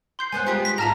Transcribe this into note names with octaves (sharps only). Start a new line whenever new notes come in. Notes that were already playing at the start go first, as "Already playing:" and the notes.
C6 G6 C7
G#3 B3 C5 G#5 F#6
F4 G4 G#4
B6
G#2 F4 A5 A#5 F6 F7